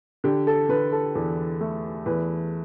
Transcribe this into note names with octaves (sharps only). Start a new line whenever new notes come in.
D3 G4
A4
D3 B4
A4
E2 A4
A3
E2 B4